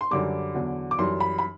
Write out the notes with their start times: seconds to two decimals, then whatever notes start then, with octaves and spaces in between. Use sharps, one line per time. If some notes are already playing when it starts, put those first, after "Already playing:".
0.01 C6
0.11 F#2 D3 G3 D6
0.54 E2 D3 F#3
0.91 D6
0.99 F#2 E3 G3 C6
1.20 B5
1.38 B5